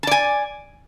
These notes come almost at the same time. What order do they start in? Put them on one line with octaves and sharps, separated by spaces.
A5 D5 G#5